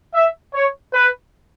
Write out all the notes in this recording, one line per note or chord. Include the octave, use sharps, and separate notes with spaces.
E5
C#5
B4